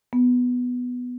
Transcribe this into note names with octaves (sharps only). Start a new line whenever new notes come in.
B3